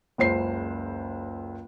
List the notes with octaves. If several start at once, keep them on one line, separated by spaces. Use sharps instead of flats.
F#1 C#2 C5 C7